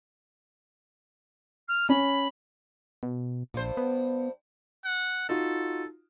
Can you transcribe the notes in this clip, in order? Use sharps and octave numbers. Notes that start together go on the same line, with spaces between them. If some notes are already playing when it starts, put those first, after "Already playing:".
F6
C#4 C#5 B5
B2
A#1 G2 C5
B3
F#5
D#4 F4 F#4 A4